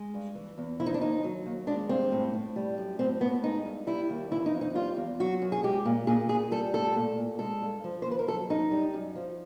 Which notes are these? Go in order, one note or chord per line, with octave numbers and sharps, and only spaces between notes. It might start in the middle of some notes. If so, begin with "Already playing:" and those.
Already playing: G#3
G2
E3
E2
F3 E4
D#4
D4
D#2 D#4
F#3
D#2
G#3 D4
G2 C4
A2
A2
G3
F#2
A2 C4
A2 B3
G#3 D#4
G2
G3 E4
D#2
E3 E4
D#4
F2
D#4
G3 F4
E2
F#3 F#4
F#2
G#4
G#3 G4
A#2
A#2 G#4
A#2 G#4
G3 A4
A2 A4
A#2
A#2
G#3 A4
G2
F3
D#2 C5
B4
A#4
F#3 A4
F#2 D#4
G3
F#2
F3